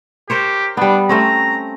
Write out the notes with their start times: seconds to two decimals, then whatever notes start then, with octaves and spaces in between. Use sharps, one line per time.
0.30 G4 A#4 C5 C#5
0.77 G3 B3 D4
1.09 A3 C4 C#4 A#5